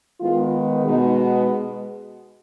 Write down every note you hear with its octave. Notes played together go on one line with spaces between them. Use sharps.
D#3 G#3 B3 F4
B2 G#3 B3 D#4